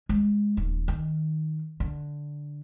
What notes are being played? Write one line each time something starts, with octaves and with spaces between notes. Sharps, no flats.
G#3
D#1
D#3
D3